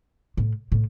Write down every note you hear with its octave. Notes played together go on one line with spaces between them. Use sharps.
A2
A2